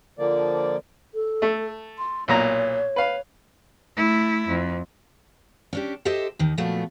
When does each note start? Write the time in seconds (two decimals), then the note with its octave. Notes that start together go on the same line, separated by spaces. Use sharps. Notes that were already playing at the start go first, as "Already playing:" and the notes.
0.19 D3 F3 A#3 D5
1.14 A4
1.42 A3
1.98 C6
2.28 B1 A#2 C#5 A#5
2.96 B4 F5
3.97 A3 E4
4.47 F2
5.73 C#4 D4 G4
6.05 G4 A4 C5 D#5 E5
6.39 D#2 D#3
6.58 A#2 F3 F#3 A3 B3